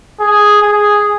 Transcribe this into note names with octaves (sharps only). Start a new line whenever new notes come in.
G#4
G#4